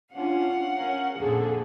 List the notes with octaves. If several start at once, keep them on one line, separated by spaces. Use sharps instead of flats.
C#4 D4 F4 F5 F#5
C#4 A#4
F2 A#2 D3 G#4 A4